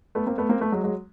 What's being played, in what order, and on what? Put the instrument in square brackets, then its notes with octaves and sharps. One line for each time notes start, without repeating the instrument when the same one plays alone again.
[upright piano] A3 B3
A#3 C4
A3 B3
A#3 C4
A3 B3
F#3 G#3
F#3 G#3